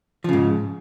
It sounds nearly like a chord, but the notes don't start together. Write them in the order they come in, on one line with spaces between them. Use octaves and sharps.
F3 C#3 G#2